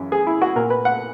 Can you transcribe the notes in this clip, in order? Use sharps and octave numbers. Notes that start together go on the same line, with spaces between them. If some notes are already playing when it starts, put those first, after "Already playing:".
Already playing: F#2 C#3 E3
G#4
E4
F#4
A#2 A#4
B4
F#5